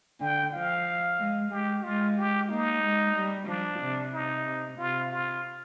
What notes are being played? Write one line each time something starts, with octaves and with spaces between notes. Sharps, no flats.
D3 G5
F3 F5
G#3
G#3 G4
G#3 F4
G4
A#3 D#4
G#3
G3
F3 D4
C3
D#4
C3
C3 F4
F4